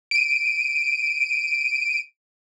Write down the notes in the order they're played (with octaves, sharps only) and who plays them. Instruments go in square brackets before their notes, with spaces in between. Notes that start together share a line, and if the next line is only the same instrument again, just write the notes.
[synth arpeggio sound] D7 D#7